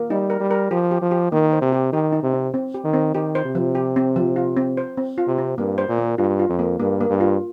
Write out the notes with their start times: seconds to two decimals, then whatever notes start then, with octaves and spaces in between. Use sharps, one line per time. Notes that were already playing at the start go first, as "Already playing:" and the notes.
Already playing: A#3
0.10 G3 D#4
0.30 A#4
0.40 G3
0.51 A#4
0.71 F3 G4
0.91 G4
1.02 F3
1.11 G4
1.32 D#3 A#3
1.53 C5
1.62 C3
1.72 G4
1.93 D#3 G4
2.12 D#4
2.23 C3
2.34 C4
2.54 C4
2.74 G4
2.84 D#3
2.94 C4
3.15 D#3 G4
3.35 C5
3.45 C3
3.55 F3
3.75 G4
3.96 C4
4.16 F3
4.36 F4
4.57 C4
4.77 C5
4.97 C4
5.18 F4
5.27 C3
5.38 C4
5.58 G2 A#3
5.78 C5
5.89 A#2
5.98 A#3
6.18 G2 F4
6.40 F4
6.49 F2
6.59 A#3
6.80 G2 A#3
7.01 A#3
7.10 G2
7.20 F4